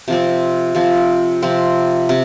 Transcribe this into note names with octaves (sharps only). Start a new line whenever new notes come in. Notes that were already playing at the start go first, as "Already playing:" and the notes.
C3 F3 C4
C3 F3 C4
C3 F3 C4
C3